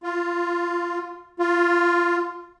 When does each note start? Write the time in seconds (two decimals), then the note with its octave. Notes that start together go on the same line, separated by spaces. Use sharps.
0.03 F4
1.39 F4